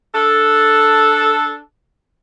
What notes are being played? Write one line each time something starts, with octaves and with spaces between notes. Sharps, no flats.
D4 A4